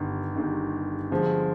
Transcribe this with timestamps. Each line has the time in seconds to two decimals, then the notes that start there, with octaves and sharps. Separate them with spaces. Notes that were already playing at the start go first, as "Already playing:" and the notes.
Already playing: G1 G2 D#3
0.35 G1 G2 D#3
1.11 G1 G2 D3 F3 G#3